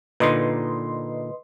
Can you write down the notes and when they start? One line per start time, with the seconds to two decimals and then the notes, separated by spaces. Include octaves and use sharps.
0.20 A#2 D3 D#4 B4 D#5 C6